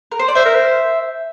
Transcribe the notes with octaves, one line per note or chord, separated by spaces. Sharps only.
A#4
C5
D5
C5 E5
A#4
C5